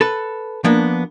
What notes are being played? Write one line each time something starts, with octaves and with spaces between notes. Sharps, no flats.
A4 B4
F3 A#3 B3 D4